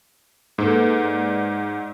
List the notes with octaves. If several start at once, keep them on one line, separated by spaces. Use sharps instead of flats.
G#2 A#3 A4 B4
D5